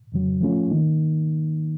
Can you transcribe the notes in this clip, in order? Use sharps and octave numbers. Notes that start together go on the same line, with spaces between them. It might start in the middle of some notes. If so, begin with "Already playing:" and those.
F2 C#3 F#3
F3 A3 C#4 F4
D#3 A#3 D#4